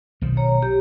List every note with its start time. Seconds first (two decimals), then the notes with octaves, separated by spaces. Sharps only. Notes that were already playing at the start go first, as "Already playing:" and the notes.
0.21 B1 D#3 F3
0.37 C#5 A#5
0.62 G4